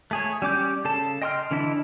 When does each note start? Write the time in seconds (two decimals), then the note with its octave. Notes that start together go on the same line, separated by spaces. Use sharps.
0.11 A3 G#4 C#5
0.42 G3 C#4 D6 G6
0.85 C#3 A4 A5
1.22 D#5 G5 C6 D#6 F6
1.51 D3 E3 D4 E4 D#5